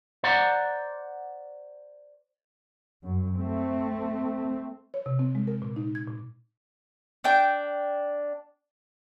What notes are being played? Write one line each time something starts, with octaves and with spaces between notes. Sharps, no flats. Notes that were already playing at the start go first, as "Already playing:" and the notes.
C5 D5 F#5 A#5
F#2
A3 C4
C#5
C3
C4
G#3
A#4
A#2
D#4
G#6
A#2
D4 G5